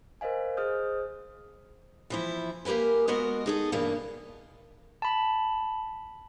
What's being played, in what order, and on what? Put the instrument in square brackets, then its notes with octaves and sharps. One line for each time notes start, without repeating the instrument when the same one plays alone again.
[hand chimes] A#4 C5 D#5 F5 G#5
G#4 C5 D#5 D#6 F6 G6
[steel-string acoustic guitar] E3 F3 E4
A#3 G4 A#4 B4 G#5
G#3 B3 F#4 A#4 D#5
D#4 G#4 A4
G2 B2 E3 A#3
[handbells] A5 B5